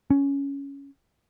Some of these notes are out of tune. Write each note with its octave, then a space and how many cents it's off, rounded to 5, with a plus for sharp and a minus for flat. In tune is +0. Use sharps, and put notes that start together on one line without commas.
C#4 +10